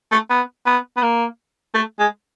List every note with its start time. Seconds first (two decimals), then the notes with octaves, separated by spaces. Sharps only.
0.12 A3
0.30 B3
0.66 B3
0.97 B3
1.02 A#3
1.74 A3
1.99 G#3